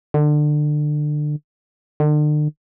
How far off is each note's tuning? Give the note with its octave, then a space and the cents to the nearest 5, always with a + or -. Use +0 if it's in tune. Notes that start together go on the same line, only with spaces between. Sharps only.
D3 +25
D3 +40